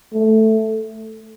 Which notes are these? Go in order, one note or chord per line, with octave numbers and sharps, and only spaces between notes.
A3